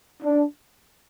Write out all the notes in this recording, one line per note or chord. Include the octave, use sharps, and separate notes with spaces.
D4